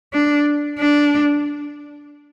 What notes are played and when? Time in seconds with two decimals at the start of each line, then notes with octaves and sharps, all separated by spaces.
0.13 D4
0.79 D4